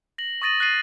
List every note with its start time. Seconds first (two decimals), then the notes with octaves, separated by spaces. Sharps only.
0.18 A#6 F#7
0.42 C#6 D#6 A6 A#6 D#7 F#7
0.60 F#6 A6 C7 D#7